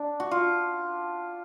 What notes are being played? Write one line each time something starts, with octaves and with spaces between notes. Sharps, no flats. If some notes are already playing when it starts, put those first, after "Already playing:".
Already playing: D4
F#4
F4